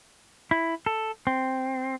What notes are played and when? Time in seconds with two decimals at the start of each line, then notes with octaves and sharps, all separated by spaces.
0.51 E4
0.86 A4
1.27 C4